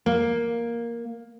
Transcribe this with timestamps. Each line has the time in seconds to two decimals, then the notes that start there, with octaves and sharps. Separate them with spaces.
0.06 A#3